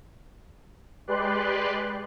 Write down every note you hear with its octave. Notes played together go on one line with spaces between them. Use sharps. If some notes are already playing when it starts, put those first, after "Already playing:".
G#3 G4 B4 D5 C6 F#6